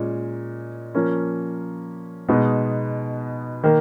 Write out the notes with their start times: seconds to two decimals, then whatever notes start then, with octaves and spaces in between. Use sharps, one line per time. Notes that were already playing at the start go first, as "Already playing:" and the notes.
Already playing: A#2 G#3 C#4
0.95 F3 A#3 C#4
2.29 B2 G#3 B3 D#4
3.64 D#3 A#3